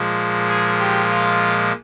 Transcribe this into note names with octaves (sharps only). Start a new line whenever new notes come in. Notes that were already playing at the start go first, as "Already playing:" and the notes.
Already playing: A#2 F3 G#3
G#4
G4
F4